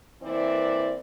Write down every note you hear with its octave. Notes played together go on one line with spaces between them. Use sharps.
E3 A#3 C4 E4 D5